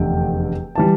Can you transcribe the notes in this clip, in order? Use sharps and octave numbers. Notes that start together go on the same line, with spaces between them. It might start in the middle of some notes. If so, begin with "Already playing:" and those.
Already playing: F1 E2 D3 A3 G5
E3 G3 A5